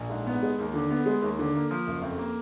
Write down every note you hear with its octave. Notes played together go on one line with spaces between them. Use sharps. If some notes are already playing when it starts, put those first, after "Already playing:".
Already playing: A#1
G#2
B3
G#3
D#2
D3
B3
G#3
D#2
D3
A#3
F3
F#1
F2
A#3